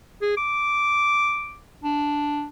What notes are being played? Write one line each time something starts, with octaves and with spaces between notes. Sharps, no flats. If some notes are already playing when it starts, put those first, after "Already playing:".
G#4
D6
D4